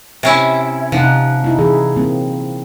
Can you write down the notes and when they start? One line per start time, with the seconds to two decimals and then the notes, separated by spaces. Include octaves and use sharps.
0.23 C3 C#4 E4
0.92 C3 F3 D#4 F#5
1.44 D#4 E4
1.59 E3 D#4 G#4
1.96 F#3 A#3 C4